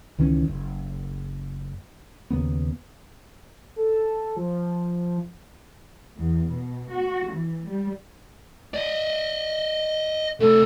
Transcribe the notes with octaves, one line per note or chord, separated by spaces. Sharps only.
C#2 D#3 E3 C#4
F#1
D#2 C#3 A#3 B3
A4
F3
E2
B2
F#4
E3
G3
D5 D#5
C3 A3 A4